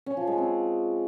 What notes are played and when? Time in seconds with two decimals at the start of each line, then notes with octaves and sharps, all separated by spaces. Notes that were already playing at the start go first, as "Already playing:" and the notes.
0.06 C#4
0.17 F3
0.27 G#3
0.38 C4